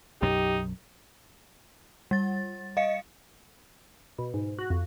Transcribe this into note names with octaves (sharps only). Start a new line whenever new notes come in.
B1 F#2 F#3 D#4 G4
G3 A6
D#5 F5 C#7
B2
G#2
F#4
F2